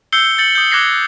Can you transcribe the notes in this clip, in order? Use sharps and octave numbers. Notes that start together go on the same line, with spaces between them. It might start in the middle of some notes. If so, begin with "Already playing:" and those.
E6 G6 C7 C#7 G7
G6 A6 C#7 F#7
D#6 G6
D6 F#6 G#6 A#6 C7 G7